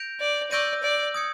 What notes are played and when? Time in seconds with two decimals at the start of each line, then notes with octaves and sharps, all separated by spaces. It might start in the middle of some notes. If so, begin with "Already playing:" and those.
Already playing: G6 A#6 D7 F7
0.20 D5
0.51 D5 C#6 E6 G6 A#6 D#7
0.83 D5
1.14 D#6 G#6 C#7